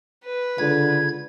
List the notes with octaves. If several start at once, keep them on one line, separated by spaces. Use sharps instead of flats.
B4
C#2 D3 G#6